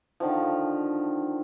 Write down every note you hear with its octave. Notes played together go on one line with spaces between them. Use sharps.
D3 D#3 F3